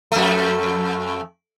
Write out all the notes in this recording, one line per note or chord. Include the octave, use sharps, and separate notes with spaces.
F2 A3